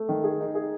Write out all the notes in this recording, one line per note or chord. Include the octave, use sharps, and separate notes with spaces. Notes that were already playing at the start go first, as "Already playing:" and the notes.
Already playing: A3
D#3
G#4
D#4
G#4